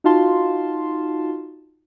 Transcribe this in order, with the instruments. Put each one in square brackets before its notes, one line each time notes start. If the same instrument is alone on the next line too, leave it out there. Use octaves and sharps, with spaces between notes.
[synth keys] D#4 F4 F#4 F5 A5 C6